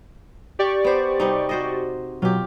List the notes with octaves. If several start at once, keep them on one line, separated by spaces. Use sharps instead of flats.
G4 D5 C#6
B3 C5
C3 G3 D#4
F#4 C5 D#5
B2 F#3 F4 G4